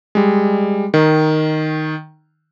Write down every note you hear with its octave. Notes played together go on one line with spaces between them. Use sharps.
G3 G#3
D#3